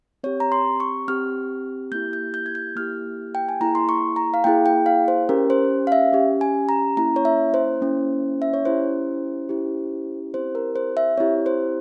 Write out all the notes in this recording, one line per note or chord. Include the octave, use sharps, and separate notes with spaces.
C4 G4 C#5
A#5
C6
C#6
C4 G4 F6
A#3 E4 G4 G6
G6
G6
G#6
G6
A#3 E4 G4 F6
G5
G#5
A#3 E4 G#4 A#5
C6
C#6
A#5
F5
A#3 E4 G#4 G5
G5
F5
C5
C#4 G4 A#4
C5
F5
E5
C#4 G4
G#5
A#5
A#3 C#4 E4 A#5
C#5
E5
C5
A#3 C#4 E4
E5
C#5
C#4 E4 G4 C5
C#4 E4 G4
C4 E4 G4 C5
A#4
C5
E5
C4 E4 G4 C#5
C5